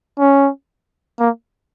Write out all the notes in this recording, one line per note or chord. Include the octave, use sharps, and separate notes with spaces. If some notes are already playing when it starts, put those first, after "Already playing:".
C#4
A#3